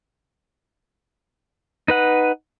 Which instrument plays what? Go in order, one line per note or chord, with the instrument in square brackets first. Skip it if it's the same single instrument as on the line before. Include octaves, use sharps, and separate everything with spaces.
[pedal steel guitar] D#4 B4 F#5